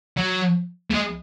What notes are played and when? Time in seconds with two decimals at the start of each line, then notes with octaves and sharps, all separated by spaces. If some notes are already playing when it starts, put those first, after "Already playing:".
0.17 F#3
0.90 A3
0.94 G#3